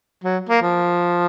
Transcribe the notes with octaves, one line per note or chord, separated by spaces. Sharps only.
F#3
A#3
F3